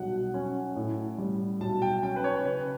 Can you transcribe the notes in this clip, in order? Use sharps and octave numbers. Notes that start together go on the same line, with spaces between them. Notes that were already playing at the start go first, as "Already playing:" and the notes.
Already playing: B1 G3 F#5
C#4
A2
G3
B1 A5
G5
C#4 G5
B4
C#5
C#3 B4